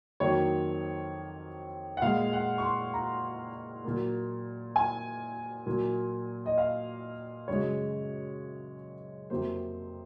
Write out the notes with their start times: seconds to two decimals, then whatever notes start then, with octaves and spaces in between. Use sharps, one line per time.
0.20 F2 D#3 F#3 A#3 C#5
1.97 F#5
2.02 A#2 G#3 F5
2.33 F#5
2.58 C#6
2.63 C6
2.94 A#5
3.85 A#2 F#3 A#3
4.76 G#5
5.66 A#2 F#3 A#3
6.46 D#5
6.58 F5
7.48 F#2 C#3 G#3 C#5
9.30 F2 C3 F#3 A#3 C5